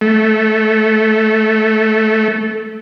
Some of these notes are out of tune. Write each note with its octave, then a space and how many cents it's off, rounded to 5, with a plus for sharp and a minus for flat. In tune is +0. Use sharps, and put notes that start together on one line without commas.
A3 -10